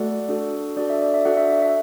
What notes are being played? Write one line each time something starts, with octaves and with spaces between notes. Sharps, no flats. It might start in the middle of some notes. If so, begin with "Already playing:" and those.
Already playing: A3 F#4 A4 D5 F#5
D4 F#4 A4
D4 F#4 A4 D5
E5
D5
E5
D4 F#4 A4 D5 F#5
E5
E5
E5